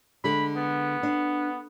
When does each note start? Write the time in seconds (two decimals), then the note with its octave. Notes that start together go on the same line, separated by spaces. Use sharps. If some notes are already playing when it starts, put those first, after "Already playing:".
0.24 D3 G#3 A4 B5
0.57 B3
1.03 D4